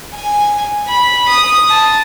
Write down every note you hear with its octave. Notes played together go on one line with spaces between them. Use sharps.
G#5
B5
D#6
A5